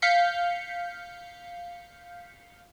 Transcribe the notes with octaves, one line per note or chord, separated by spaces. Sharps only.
F5 G6 B6 C#7